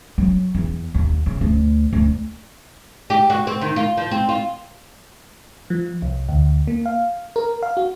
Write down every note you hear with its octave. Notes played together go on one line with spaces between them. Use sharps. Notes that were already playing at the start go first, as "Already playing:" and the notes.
F#3
E2
D#2
C#3
D2
D2
G4
F#4
C4
D#3
F4
F3
C4
F4
F3
C2
D2
A#3
F5
A#4
F5
F#4